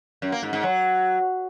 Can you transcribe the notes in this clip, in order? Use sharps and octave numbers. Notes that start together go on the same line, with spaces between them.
F#2
A#3
G#2
G#2
F#3